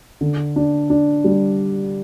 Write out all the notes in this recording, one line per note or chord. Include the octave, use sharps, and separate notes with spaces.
D3
D4
D4
G3